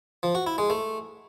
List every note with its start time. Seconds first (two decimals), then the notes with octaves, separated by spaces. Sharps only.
0.23 F3
0.35 F#4
0.47 E4
0.58 G#3
0.70 A3